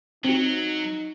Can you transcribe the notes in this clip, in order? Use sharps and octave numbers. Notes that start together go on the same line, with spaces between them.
F#3 C4 D#4 F#4